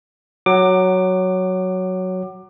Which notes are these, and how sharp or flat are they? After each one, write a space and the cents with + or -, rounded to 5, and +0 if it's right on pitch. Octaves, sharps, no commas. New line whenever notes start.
F#3 +0 F#5 +20 D6 +20